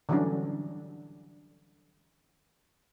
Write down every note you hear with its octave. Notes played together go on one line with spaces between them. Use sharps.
D3 E3 F#3 G3 C#4 D4